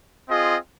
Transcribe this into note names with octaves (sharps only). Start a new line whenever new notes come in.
C4 F4 G#4 D#5